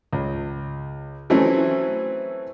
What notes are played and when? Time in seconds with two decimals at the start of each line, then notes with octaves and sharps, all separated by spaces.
0.13 C#2
1.30 E3 F#3 A3 C4 C#4 E4